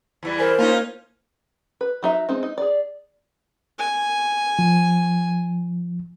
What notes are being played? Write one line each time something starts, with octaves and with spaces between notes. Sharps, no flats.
E2 E3 G3
A#4 C5 G#5 B5
A#3 C#4 D#4 F4
B4
F#3 D#4 E5
G#3 C4 D#4
D#4
G#4 D5
G#5
F3